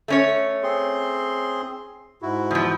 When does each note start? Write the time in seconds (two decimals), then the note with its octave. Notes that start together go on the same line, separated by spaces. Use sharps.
0.08 A3 C#4 C#5
0.63 C4 G#4 C6
2.22 G#2 E4 F#4
2.51 E2 F3